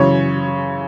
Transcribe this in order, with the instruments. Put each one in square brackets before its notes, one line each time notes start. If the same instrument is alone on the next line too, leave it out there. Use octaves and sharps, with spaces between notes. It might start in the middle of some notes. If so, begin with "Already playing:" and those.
Already playing: [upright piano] F#2 C#3 E3 C#5